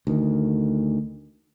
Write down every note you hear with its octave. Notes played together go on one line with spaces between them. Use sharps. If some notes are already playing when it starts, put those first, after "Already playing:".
D2 D#3